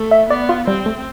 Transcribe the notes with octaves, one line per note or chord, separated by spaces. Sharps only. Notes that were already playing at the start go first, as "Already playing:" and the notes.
Already playing: A3
E5
B3 D5
F4
G3 C4
A3